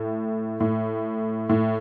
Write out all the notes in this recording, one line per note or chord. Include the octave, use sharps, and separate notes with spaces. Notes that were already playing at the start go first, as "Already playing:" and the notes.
Already playing: A2
A2
A2